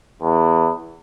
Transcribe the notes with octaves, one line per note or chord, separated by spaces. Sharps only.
E2